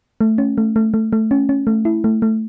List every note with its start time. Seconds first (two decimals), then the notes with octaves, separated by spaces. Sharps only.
0.21 A3
0.38 C#4
0.58 A3
0.76 A3
0.94 A3
1.13 A3
1.31 C#4
1.49 C#4
1.67 A3
1.85 E4
2.04 A3
2.22 A3